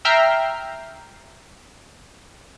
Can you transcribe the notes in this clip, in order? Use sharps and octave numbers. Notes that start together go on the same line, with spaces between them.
E5 G5 A#5 F6 C7